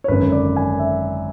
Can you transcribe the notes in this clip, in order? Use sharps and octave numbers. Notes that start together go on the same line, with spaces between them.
C#5
G#1 F#2 D3 B4
D5
G#5
E5